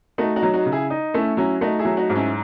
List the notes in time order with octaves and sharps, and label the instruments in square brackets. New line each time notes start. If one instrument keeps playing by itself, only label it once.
[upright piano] A3 [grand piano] D#4 F#4
[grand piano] D#4 F#4
[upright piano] F#3
[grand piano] D#4 F#4
[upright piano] C#3
[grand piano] E4 G#4
[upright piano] D#4
[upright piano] A3 [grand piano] C#4 E4
[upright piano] F#3 [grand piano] C#4 E4
[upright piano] A3 [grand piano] D#4 F#4
[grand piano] E4 G#4
[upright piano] F#3
[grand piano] D#4 F#4
[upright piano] G#2
[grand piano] C#4 E4